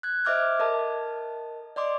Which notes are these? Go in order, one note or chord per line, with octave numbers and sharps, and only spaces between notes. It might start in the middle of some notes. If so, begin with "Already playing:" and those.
F#6 G#6
C5 D#5 E5 D6 F6 G#6
A4 A#4 D#5 A5
D5 D#5 C6 D6